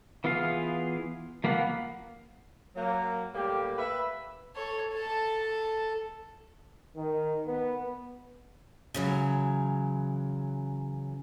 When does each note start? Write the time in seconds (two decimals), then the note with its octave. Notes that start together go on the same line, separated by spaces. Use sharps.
0.24 E3 B3 F4 G#4 F5
1.44 F3 A#3 B3 F5 F#5
2.76 F#3 A#3
3.34 A2 G3 A#3 G4
3.78 B4 E5
4.56 A4 C#5
4.94 A4 A5
6.96 D#3
7.47 B3
8.94 C#3 E3 F#3